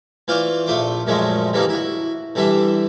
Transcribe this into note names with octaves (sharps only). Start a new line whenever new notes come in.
E3 F4 C5 D5 F5 C#6
A#1 A3 F4 C5 C6 D6
F#2 A#2 F3 G#3 A3 C#4
D3 E3 G3 A#3 C#4 D#4
E4 F#4
D3 E3 G3 D4 E5